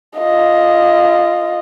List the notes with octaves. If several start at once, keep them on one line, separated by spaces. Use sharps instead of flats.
F4 D#5